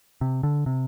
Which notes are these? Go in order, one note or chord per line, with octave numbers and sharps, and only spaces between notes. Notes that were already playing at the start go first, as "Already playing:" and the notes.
C3
D3
C3